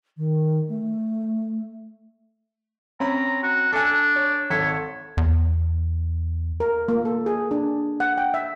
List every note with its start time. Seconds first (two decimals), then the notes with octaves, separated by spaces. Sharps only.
0.17 D#3
0.69 A3
3.00 C4 C#4 A#5 B5
3.43 F#4
3.73 D4 A4 G#5
4.16 C#5
4.50 G#1 A4 C#5 B6
5.17 E2
6.60 A#4
6.88 A#3
7.05 A4
7.26 G#4
7.51 D4
8.00 F#5
8.18 G5
8.34 E5